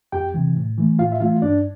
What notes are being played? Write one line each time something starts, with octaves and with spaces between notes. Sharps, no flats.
F2 G4 G5
C3 E3
A2
E3 A3
A2 F4 F5
E5
E3 A3 F4 F5
G2 D4 D5